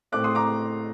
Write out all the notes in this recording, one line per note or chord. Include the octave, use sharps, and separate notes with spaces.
A2 A3 C4 D6 F#6
C6 D#6
A#5 D6